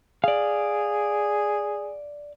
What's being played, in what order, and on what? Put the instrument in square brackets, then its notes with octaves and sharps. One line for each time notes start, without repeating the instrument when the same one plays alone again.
[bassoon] G#4 [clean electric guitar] D5 F5